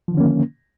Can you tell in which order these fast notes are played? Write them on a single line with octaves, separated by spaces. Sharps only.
F3 D#3 D3 C#4 A#3